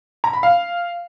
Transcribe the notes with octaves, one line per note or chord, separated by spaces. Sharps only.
A#5
B5
F5